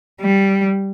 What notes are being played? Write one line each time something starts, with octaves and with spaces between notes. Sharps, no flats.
G3